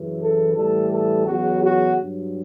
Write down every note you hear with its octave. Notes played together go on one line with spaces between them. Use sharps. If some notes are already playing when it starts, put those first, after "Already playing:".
Already playing: F#2 C#3 E3
A4
A2 E3 G3 A4
A4
E2 C#3 F#3 F#4
F#4
G2 F#3